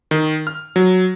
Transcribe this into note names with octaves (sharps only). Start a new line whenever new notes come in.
D#3
F6
F#3